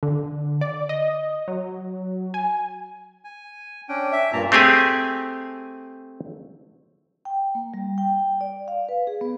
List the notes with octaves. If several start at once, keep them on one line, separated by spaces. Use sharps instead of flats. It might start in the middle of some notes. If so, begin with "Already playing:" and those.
D3
D5
D#5
F#3
G#5
G#5
C#4 D4 G5
E5
G2 A#2 A#3 A5 A#5
A3 C4 G4 G#4 G#5
G5
A#3
G3
G5
D5
F5
B4
G#4
B3